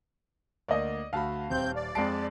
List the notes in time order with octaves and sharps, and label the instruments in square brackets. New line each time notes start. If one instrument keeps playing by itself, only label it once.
[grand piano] D2 A#3 [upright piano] D5 D#5
[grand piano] D2 F#4 B5 [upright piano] F5 A5
[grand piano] D#1 [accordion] C4 G6
[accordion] D5
[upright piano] F2 G#3 A5 [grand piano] C7 D7